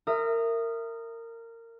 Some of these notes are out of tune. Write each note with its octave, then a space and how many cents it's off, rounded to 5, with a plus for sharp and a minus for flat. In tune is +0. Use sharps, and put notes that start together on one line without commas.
A#4 -20 E5 +15 D#6 -15